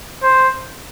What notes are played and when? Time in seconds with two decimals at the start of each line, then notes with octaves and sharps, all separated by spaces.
0.23 C5